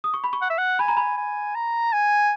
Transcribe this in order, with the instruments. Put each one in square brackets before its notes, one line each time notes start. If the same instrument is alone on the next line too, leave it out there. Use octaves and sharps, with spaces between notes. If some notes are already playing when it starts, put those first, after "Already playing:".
[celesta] D#6
C#6
B5
C#6
[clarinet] F#5
E5
F#5
[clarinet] G#5 [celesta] B5
[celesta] A#5
B5
[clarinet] G#5
A#5
G#5